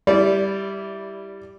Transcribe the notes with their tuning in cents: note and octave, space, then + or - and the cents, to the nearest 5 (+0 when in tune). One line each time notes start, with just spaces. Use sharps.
G3 +0 E4 +0 D5 -20